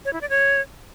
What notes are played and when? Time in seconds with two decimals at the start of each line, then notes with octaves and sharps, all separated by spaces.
0.05 C#5
0.13 E4
0.21 D5
0.29 C#5